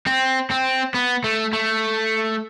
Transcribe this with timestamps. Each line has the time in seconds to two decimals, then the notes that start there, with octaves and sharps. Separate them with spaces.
0.07 C4
0.50 C4
0.94 B3
1.24 A3
1.53 A3